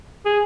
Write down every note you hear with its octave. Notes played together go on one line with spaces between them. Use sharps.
G#4